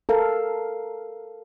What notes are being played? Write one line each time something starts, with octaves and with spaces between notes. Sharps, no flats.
A4 A#4 F5